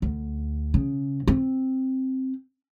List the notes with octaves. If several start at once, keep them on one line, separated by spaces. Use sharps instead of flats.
D2
C#3
C4